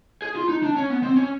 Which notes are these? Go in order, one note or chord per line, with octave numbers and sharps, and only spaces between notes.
G#4
F4
D#4
D4
C#4
B3
C4
C#4